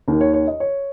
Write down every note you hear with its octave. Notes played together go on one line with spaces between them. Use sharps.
D#2 D#3 A#4
C#5
C#5
D#5
C#5